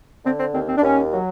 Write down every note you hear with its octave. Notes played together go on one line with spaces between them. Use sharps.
D3 C4
C4
D#2 C4
C4
D4
D#2 C#4
F#3